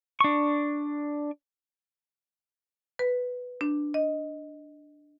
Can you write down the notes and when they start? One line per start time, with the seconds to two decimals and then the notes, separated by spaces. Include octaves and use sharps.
0.21 D4 C#6
2.99 B4
3.61 D4
3.94 D#5